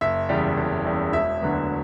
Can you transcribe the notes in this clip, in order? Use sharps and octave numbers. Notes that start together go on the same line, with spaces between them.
F#1 E5
E2 C#3 G3
F#1
E2 C#3 G3
E1 E5
D2 D3 F#3 B3